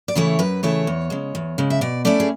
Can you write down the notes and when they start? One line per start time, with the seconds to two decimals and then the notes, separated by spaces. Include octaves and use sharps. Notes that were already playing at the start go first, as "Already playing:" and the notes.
0.08 D5
0.15 C#3 E3 A3 E4 C#5
0.39 F#2 B4
0.63 C#3 E3 A3 E4 C#5
0.87 E2
1.10 C#3 G#3
1.35 E2
1.58 C#3 G#3
1.70 E5
1.81 B2 D5
2.05 A3 C#4 E4 D5
2.20 G#4